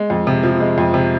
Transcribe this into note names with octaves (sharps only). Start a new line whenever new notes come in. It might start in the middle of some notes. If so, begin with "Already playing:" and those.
Already playing: G#3
F2
C3
F3
G#3
F2
C3